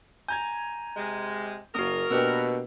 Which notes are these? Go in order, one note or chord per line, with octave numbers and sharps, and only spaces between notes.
G#5 A#5 G6 G#6
C3 G#3
F#1 A#3 F#4 A#4 D#6
B2 A#3 D4 G4 B4 E6